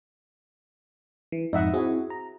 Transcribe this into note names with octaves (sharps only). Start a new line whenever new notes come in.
E3
F2 G#2 D#4 D#5 E5 F#5
C4 E4 F#4 G#4
A#5